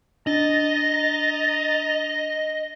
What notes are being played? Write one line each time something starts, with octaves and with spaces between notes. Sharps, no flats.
D4 D#5 A#5 A6